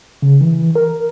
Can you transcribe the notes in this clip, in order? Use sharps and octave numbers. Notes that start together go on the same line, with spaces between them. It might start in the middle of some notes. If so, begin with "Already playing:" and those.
C#3
E3
A#4